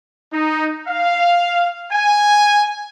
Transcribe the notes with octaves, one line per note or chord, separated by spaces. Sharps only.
D#4
F5
G#5